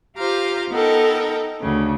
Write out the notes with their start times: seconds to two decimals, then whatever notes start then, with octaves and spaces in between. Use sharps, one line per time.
0.16 F4 G4 C5 F5 A#5
0.71 B3 D#4 A4 A#4 G5
1.60 D2 C#3